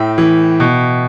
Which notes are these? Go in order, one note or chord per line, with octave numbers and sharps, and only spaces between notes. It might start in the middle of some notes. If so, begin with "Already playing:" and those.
Already playing: A2 E5 G5
E3
B2